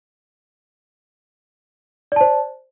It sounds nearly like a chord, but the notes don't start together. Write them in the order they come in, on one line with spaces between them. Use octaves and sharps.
D5 A5 C5